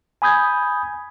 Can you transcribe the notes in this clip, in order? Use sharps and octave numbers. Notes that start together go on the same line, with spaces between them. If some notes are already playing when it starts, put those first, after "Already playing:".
G#5 B5 D#6 G6 G#6